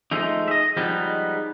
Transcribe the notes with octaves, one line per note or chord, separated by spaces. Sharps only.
F3 G#3 A3 D#4
D#5 E5
F3 G3 G#3 B3 D#4